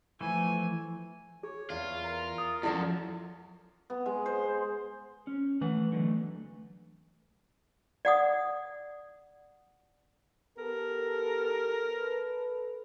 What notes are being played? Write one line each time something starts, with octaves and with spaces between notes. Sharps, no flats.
E3 F3 A3 G#5
G#4 C#5
E2 F4
A#4
D#6
F#2 F3 E4 A4 D5
B3
G#3
C5
C#4
E3 A3 F#5
D3 F#3 A3
D5 F#5 D#6
B3 G4 A4 A#4
A4 B4